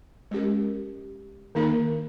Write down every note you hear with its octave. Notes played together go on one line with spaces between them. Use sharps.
G#3 C#4 G4 A#4
D#3 A#3 D#4 A#4